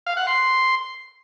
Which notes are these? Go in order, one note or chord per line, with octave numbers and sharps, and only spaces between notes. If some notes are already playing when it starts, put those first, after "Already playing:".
F5
F#5
C6